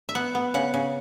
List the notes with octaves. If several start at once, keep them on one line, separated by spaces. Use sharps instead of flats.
E5
B3 F#5
B3
C#3 F#5
C#3